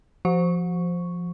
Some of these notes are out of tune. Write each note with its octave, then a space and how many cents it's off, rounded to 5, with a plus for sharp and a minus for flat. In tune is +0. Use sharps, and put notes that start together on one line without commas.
F3 +0 C5 +0 C#6 +0